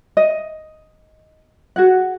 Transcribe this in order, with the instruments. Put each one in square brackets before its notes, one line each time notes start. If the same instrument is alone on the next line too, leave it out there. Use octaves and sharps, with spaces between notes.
[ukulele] D#5
F#4 G#4 F#5